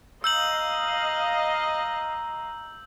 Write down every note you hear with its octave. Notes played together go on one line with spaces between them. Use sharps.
D#5 F5 A#5 E6 G6 F#7